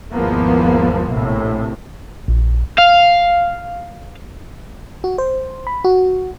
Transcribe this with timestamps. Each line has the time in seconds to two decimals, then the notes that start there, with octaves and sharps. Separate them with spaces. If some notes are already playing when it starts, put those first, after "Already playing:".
0.12 G#1 E2 F3 A#3 B3
1.12 A#1 A2 C3
2.28 A#1
2.79 F5
5.04 F#4
5.18 C5
5.67 B5
5.84 F#4